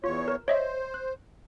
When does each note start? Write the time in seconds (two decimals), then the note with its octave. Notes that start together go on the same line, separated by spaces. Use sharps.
0.04 E2 F4 C#5
0.28 A#4
0.48 C5 C#5 D#5 E5
0.94 F#6